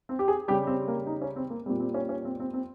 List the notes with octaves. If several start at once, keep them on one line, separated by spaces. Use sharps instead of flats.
C4
G4
G#4
C#3 G3 G4
C4
A#3
D#4
C#4
C4
A#3
A#2 G3 C4
C4
C#4
C#4
C4
C4
C4